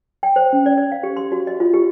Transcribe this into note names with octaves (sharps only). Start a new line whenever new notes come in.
G5
C5
C#4
D5
D5
F5
G4
C6
F#4
D#5
F4
G4